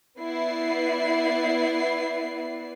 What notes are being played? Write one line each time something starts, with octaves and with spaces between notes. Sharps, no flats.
B3 E4 B4 D5 C7